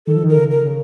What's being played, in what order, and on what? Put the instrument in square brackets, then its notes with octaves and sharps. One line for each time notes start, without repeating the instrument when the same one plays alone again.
[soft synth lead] D#3 [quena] A4
[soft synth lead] F3
D#3
[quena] A#4
[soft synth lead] C#3
[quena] A#4
[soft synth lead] C#3